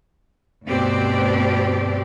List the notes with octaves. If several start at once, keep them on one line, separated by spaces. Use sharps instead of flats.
D2 G2 B2 C4 G4 D5